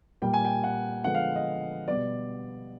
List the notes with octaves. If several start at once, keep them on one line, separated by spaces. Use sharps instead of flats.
A#2 G3 A#3 G5
G#5
G5
F#5
D3 F3 G#3 B3 F#5
F5
D#5
B2 G3 B3 D5